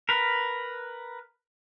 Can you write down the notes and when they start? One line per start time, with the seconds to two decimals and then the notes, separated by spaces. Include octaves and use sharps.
0.09 A#4 B4